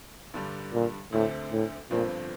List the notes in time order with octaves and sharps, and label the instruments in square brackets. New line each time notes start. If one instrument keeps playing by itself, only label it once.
[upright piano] G2 D3 G3
[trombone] A#2
[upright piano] D2 D3 A3 C4 [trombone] A2
[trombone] A2
[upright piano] G1 G2 F3 C4 [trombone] A#2